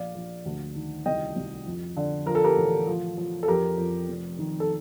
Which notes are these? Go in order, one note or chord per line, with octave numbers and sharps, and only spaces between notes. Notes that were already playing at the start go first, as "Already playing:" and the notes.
Already playing: A#1 D5 F5
A#1
D2
D#3
C2 D#5 G5
C2
F2
D3
F3 A#4
A4
G4 A#4
A1
F3
F3
A4
F2 G4 A#4
F2
F1
D#3
A4